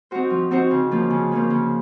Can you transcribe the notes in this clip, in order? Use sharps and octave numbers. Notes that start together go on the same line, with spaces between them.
C4 D#4 F#4 C5
F3
C4 D#4 F#4 C5
C#3
F3 A#3 C#4
C#3
F3 A#3 C#4
C#3